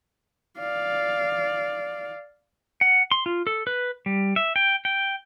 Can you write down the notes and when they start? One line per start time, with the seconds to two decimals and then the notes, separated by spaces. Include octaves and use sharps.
0.59 D5 F5
2.81 F#5
3.12 C6
3.26 F4
3.47 A4
3.67 B4
4.06 G3
4.36 E5
4.56 G5
4.85 G5